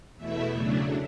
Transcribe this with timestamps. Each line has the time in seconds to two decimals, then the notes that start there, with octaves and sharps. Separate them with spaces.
0.16 E2 B2 A3 E4 E5
0.51 C#3 F#3 A3 D4